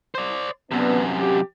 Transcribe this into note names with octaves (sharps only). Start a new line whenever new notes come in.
C5 D5
F#2 C3 B3 D4
G4